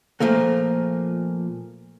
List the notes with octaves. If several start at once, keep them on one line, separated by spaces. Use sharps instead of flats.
A#2 F3 A3 A#3